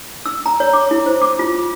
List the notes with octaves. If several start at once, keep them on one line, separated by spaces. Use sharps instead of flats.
E6
A#5
C#5
D6
E4
C5
D6
F4